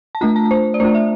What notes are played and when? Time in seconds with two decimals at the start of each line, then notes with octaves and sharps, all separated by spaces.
0.15 A5
0.21 A3 D4 F4 A#5
0.36 A5
0.51 C5
0.74 D5
0.80 A3 D4 F4 C5
0.95 E5